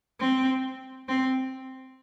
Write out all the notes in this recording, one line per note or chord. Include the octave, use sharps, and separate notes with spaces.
C4
C4